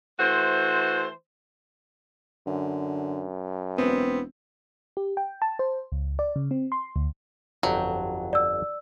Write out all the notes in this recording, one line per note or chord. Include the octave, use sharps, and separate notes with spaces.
E3 A3 F#4 C5
F#2 D3
E1 B3 C4
G4
G5
A5
C5
C#2
D5
C#3
C4
C6
D2
G1 F2 F#3 G4
D5 E6